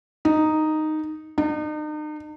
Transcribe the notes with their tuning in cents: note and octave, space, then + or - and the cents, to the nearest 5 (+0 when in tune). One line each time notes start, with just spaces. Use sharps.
D#4 -5
D#4 -40